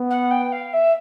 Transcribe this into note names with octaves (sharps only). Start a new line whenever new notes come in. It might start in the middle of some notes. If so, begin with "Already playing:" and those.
Already playing: B3
F#5
G5
F5
E5